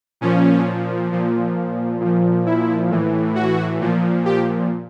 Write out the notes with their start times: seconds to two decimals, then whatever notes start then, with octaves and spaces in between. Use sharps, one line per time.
0.21 A#2 F3 C#4
1.11 A#2 F3
2.00 A#2 F3
2.46 E4
2.90 A2 E3
3.35 F#4
3.81 A#2 F3
4.25 G4